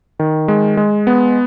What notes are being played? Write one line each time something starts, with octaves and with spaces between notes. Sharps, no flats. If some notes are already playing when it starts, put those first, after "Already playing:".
D#3
G#3
G#3
B3